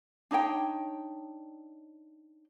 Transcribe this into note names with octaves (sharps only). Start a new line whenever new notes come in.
D4 D#4 C#5 G5